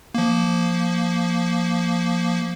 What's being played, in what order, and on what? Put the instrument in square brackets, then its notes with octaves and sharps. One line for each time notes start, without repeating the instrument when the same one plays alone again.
[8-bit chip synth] F3 A#3